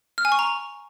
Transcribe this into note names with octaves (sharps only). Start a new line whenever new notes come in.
F6
G#5
C#6
A#5